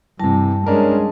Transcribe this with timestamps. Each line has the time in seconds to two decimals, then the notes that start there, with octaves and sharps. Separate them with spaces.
0.19 G2 C3 E3 G3 A5
0.66 G#3 C#4 D4 A#4